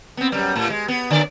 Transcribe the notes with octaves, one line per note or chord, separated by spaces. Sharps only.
B3 C4
F#2 G3
A2
G#3
B3
D3 D5